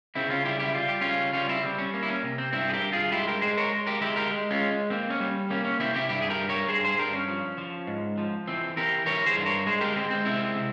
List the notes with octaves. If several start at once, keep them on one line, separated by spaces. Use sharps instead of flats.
C#3 C4 E4
C#4 F4
G3 E4 G4
E4 G4
G3 F4
G4
C#3 C#4 F4
G3 C#4 F4
C4 E4
G3 C4
C#4
A#3 C#4
E4
C#4
C3
C4
G2 C4 E4
G#4
G4 A#4
G2
F4 G#4
G#3 E4 G4
G4 A#4
G#3 G#4 C5
A#4 C#5
G#3
G4 A#4
G#3 E4 G4
G4 A#4
G#3
C#4 F4
G#3
A#3 C4
C#4
G3
A#3 C#4
C#4
C3 C4 E4
E4 G4
G2 E4 G4
G#4
G4 A#4
G2
A#4 C#5
G2 G#4 C5
G#4 C5
G2 G4 A#4
C#4
F3
F3
G#2
F3
E3 C4
E3 G4 A#4
E3 A#4 C#5
G#4 C5
G2
A#4 C#5
G#3 G#4 C5
G4 A#4
G#3 C4
C4
C3 C4 E4
C3